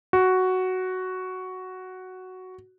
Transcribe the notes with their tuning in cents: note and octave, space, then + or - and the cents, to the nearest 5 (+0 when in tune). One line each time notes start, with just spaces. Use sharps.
F#4 +5